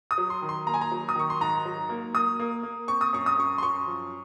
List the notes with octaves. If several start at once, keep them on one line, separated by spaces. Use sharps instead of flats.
D#6
F#3
C6
D#3
C6
A#3 A#5
G#5
A#5
F#3
D#6
D#3 C#6
C6
G#2 A#5
F#3
A#3
A#3 D#6
A#3
A#3
C4 C#6
D#6
F#2 C#6
D#6
F#2 C#6
C6
F#2 C#6
F3